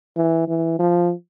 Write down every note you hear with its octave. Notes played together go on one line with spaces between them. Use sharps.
E3
E3
F3